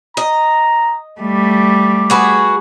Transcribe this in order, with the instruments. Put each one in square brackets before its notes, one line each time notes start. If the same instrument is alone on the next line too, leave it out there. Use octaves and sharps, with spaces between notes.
[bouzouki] D#5 [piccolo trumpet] A#5
[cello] G3 A3 [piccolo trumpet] D6
[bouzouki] F#4 G#4 B4